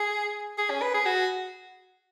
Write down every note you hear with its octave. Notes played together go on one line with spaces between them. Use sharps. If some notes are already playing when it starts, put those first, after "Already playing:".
Already playing: G#4
G#4
C#4
B4
G#4
F#4